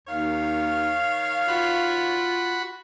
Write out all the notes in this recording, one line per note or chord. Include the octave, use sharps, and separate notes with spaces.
D#2 D#3 C#5 F5
F4 F#4 B5